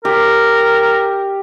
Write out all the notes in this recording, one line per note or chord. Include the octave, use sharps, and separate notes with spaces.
G4 A#4